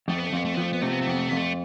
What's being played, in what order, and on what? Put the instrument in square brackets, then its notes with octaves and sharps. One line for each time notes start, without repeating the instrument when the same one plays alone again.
[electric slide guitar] F2 [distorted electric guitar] A3
[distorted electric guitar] B3
A3
[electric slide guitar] F2 [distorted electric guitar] B3
[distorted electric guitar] A3
[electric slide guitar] F3 [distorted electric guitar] B3
[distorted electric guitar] A3
B3
[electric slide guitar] C3 [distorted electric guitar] A3
[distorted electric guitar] B3
A3
[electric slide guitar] F2 [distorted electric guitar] B3
[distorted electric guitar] A3
[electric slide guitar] F2 [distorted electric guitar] B3
[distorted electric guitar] A3